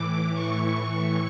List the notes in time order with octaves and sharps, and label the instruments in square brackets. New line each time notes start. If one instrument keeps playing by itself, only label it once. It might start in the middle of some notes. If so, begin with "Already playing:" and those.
Already playing: [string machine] A2 E3 D6
A2 E3 C#6